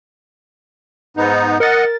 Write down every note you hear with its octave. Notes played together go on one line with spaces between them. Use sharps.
G#2 B3 D#4
A#4 D#5 F#5 A6